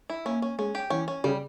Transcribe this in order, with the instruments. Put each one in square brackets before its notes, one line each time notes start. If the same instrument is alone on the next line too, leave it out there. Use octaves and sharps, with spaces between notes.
[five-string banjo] E4
[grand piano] A#3 [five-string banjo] C#4
[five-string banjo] C#4
[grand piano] G#3 [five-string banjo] C#4
[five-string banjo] G4
[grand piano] E3 [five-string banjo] C#4
[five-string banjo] C#4
[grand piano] C#3 [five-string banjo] G3